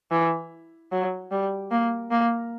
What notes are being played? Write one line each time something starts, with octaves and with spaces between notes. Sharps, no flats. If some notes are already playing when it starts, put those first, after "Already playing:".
E3
F#3
G3
A#3
A#3